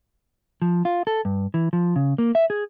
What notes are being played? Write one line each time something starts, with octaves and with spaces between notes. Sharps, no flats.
F3
F4
A4
G2
E3
F3
C#3
A#3
E5
G#4